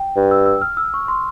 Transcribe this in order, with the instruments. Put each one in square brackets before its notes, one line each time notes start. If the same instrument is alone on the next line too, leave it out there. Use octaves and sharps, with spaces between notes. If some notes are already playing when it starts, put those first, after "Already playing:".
Already playing: [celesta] G5
[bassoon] G2
[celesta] E6
E6
F6
E6
C#6
C6